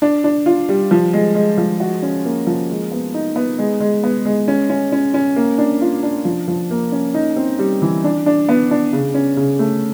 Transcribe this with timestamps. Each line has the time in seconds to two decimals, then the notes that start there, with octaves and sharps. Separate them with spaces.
0.02 D4
0.24 D4
0.46 F4
0.69 G3
0.91 F3
1.13 G#3
1.35 G#3
1.58 F3
1.80 F#4
2.02 C#4
2.25 A#3
2.47 F3
2.70 G#3
2.91 B3
3.14 D#4
3.36 B3
3.58 G#3
3.80 G#3
4.03 B3
4.25 G#3
4.48 C#4
4.70 C#4
4.92 C#4
5.14 C#4
5.36 A#3
5.58 D4
5.81 F4
6.03 D4
6.25 F3
6.48 F3
6.71 A#3
6.92 C#4
7.14 D#4
7.36 C4
7.59 G3
7.82 E3
8.04 D4
8.26 D4
8.49 B3
8.71 D4
8.93 C#3
9.14 C#4
9.37 C#3
9.59 A3